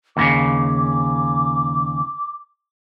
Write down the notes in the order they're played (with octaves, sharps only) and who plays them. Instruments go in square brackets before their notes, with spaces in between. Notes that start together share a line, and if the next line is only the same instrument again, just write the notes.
[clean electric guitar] D#2 A2 C#3 [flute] D6